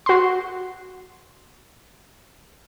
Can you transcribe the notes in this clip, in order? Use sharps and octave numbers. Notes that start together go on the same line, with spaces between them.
F#4 C6